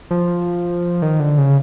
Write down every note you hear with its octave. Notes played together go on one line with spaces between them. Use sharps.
F3
D#3
D3
C#3